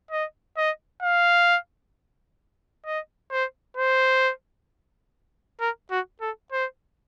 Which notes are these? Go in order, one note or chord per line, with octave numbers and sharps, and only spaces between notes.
D#5
D#5
F5
D#5
C5
C5
A#4
F#4
A4
C5